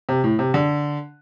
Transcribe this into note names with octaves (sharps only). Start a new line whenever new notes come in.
C3
A2
C3
D3